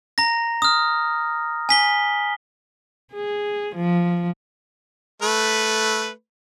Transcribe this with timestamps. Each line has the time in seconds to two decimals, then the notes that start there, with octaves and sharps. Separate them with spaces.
0.18 A#5 A#6
0.62 D#6 F6
1.69 G#5 B6 G7
3.14 G#4
3.76 F3
5.22 A3 B4